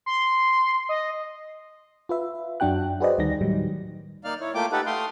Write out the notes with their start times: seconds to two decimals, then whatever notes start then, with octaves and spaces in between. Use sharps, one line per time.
0.06 C6
0.89 D#5
2.09 F4 B4 E5
2.60 F#2 F#3 D4 F#4 G5 F#6
3.00 F#4 G#4 B4 C5 D5 D#5
3.18 D2 D#3 G3 D#4 A#6
3.41 A2 D#3 F#3 G3
4.24 A#3 D#4 D5 F5 F6
4.40 E4 C#5
4.55 A3 A#3 F4 G5 D6
4.72 D#4 G4 A4 B4 F#5
4.86 A3 F5 G5 C6 D#6